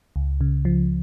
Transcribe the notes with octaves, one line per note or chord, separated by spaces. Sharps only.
C#2
C#3
F3